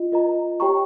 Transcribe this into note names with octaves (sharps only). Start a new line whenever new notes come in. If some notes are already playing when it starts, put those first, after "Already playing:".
Already playing: F4 D#5
F4 A#4 D#5 A#5
G4 C#5 G5 A#5 C#6